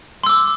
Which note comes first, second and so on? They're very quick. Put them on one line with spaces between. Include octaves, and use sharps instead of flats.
C6 E6 D6